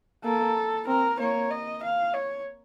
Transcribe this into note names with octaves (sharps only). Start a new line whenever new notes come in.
A#3 A4
C4 A#4
A#3 C#5
D#5
F5
C#5